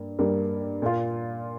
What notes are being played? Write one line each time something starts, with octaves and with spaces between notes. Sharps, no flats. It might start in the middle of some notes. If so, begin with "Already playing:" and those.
Already playing: G2 A#3
G2 G3 A#3
A#2 A#3 F4